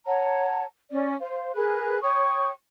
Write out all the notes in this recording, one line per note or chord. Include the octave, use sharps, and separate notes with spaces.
C#5 F#5 A5 A#5
C#4 D5
C5 F5
G#4 A#4 B4 F#6
C#5 G5 C#6 D#6